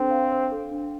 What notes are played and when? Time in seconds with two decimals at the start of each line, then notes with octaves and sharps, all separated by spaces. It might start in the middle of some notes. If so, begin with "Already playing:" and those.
Already playing: C4 D4 A4 C5
0.10 F5
0.31 C5
0.52 A4
0.72 D4